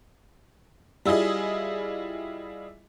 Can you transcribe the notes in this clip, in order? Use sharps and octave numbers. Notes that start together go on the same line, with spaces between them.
G3 E4 F4 G#4 D#5